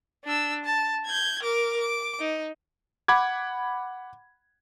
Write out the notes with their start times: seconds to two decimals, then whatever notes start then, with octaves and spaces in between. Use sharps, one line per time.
0.25 D4 E6
0.65 A5
1.06 G6 G#6
1.43 A#4 D6
1.81 D6
2.20 D#4
3.08 F#5 B5 D6 G#6